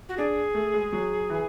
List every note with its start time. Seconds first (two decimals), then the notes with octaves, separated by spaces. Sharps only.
0.09 F#4
0.17 D4 G#4
0.54 A3
0.74 G#3
0.93 F#3
1.30 E3